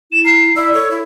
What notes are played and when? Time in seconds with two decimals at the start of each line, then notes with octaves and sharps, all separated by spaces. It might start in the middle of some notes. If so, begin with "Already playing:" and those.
0.12 E4 E7
0.25 A#5 C7
0.56 E4 D5 E6
0.74 A4 C#5
0.91 E4